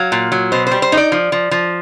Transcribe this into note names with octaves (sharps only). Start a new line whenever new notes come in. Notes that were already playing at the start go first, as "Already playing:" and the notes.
Already playing: F#3 F5
A#2
F#3
B2 C5
G3 C5
C5
D#4
D5
F3
F3
F3